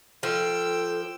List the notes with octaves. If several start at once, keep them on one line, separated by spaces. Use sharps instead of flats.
F3 A4 G5 E6